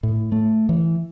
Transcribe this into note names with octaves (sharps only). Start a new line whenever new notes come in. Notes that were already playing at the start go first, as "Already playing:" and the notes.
A2
A3
E3